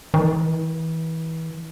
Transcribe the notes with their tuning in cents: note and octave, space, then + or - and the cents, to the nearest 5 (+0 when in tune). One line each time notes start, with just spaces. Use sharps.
E3 -30